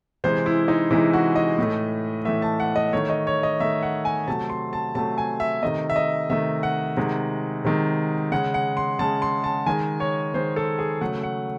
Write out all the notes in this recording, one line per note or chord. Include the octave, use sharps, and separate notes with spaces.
C3 E3 G#3 C5
E4
D#4
C3 E3 G#3 E4
F#4
D#5
A2 E3 A3
A2 E3 A3 E5
A5
F#5
D#5
D#3 A3 C#5
D#5
C#5
D#5
D#3 A3 E5
F#5
G#5
C3 F#3 A3 A5
C6
A5
C3 F#3 A3 A5
G#5
E5
C3 D#3 A3 D#5
E5
D#5
C3 D#3 A3 E5
F#5
C3 D#3 G#3
C3 D#3 G#3
C#3 G#3 F#5
F#5
C6
C#3 G#3 A5
C6
A5
D#3 G#3 G#5
C#5
D#3 G#3 C5
A4
G#4
C#3 F#3 A3 F#5
F#5